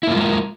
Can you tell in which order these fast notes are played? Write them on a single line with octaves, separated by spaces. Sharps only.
E4 A#3 F4 G#3 A#4